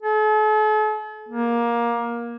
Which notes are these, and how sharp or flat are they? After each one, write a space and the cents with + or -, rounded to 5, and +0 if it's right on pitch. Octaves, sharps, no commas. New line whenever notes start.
A4 -45
A#3 +15